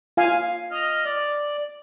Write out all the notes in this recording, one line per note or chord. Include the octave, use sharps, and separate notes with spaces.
F4 F5 G#5
D#5 F6
D5